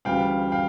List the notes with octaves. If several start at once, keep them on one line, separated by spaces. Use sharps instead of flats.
D2 C#3 E3 G3 F5 G5
F5 G5